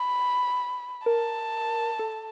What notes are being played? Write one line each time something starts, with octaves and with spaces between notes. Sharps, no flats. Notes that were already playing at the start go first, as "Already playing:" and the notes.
Already playing: B5
A#4 A5
A4